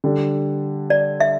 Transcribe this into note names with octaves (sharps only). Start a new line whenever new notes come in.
D3 G3 D4
D5
E5